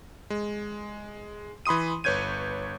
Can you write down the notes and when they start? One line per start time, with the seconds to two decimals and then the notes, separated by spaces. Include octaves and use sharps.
0.30 G#3
1.66 E3 B5 C6 D#6 D#7
2.04 G1 B4 C#5 G6 G#6 D#7